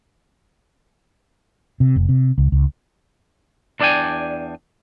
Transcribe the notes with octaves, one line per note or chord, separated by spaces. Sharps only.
C3
F1
C3
C#2
C#2
E2 D4 D5 D#5 G5 G#5